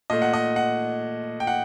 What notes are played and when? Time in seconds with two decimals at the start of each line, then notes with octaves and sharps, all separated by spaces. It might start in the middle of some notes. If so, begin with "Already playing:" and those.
0.10 A#2 A3 D#5
0.22 F#5
0.34 D#5
0.56 F#5
1.40 G5
1.47 F#5